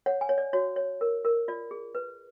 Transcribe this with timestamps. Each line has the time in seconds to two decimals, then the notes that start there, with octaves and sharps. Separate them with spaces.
0.06 C#5 F#5
0.21 G#5
0.29 C#5
0.38 D5
0.53 F#4 C#5
0.76 C#5
1.01 A#4
1.25 A#4
1.48 F4 D5
1.71 G#4
1.95 B4